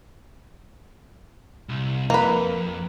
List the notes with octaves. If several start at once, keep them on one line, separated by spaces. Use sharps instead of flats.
C2
F2 A#3 B4